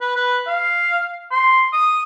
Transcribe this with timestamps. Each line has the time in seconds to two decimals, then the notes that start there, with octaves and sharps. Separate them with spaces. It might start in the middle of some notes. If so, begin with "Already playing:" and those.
0.01 B4
0.16 B4
0.47 F5
1.31 C6
1.73 D#6